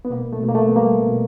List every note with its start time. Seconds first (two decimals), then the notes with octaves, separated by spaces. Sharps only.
0.05 B3
0.10 B2 A#3
0.33 A3
0.43 B2
0.49 A#3
0.55 A3
0.68 B3
0.76 G3 A#3
1.09 B2